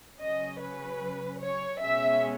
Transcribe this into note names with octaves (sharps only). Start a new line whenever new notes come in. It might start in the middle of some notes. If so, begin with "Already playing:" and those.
C#3 F#3 C#4 D#5
B4
C#5
B2 G#3 C#4 E5